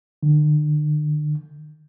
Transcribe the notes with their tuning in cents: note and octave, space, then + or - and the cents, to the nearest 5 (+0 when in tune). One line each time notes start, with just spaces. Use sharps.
D3 +40